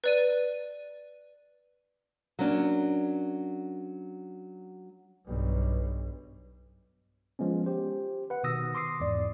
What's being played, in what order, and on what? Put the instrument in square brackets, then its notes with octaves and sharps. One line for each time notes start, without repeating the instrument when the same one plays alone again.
[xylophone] B4 D5 D#7
[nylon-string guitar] F#3 A#3 C#4 D4
[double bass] B1 G2
[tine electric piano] F3 G#3 B3 C#4
G4 C5
B4 F#5
B2 D#3 D#6 E6 A#6
C6 D6 D#6 C7
E2 G#2 D5